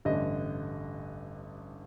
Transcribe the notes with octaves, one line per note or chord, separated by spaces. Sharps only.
A1 G2 D3 D#5